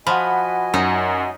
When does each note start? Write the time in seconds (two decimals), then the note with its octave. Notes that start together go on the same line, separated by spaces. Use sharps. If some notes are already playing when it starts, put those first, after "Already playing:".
0.07 F3 F#4 D#5 F#5 G#5 B5
0.74 F#2 D#4